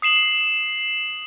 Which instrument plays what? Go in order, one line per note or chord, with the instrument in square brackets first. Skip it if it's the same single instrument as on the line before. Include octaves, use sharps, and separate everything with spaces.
[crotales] D#6 C7 E7 F#7